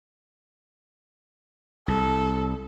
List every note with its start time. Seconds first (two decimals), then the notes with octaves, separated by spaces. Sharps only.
1.88 C2 A4